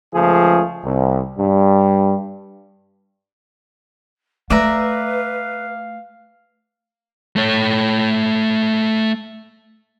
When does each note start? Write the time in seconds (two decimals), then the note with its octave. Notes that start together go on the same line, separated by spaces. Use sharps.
0.13 C#2 F3 A3 G#4
0.84 C2
1.37 G2 G3
4.50 A3 B4 D5 E5 F5 A#5
7.36 A3 C#5